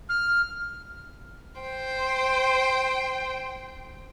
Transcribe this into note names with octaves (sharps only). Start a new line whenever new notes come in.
F6
C5 G5